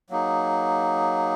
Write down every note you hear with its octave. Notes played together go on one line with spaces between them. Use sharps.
F#3 A#3 D#4 G#4